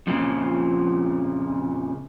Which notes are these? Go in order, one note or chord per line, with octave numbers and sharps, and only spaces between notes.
F2 A#2 C#3 F3